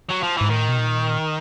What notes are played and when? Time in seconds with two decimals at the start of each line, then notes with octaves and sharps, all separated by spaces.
0.10 F#3
0.23 F3
0.37 G#2 E3
0.50 A2 D#3
0.69 B2
0.78 A#2